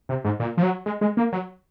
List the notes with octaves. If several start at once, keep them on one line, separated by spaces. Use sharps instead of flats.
C3
G#2
A#2
F3
F#3
G#3
G#3
A#3
F#3